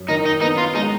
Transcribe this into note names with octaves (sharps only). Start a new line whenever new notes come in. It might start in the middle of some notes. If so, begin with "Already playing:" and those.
Already playing: F#2
D#3 D#4
D#4
B3 D#4
F4
G#3 D#4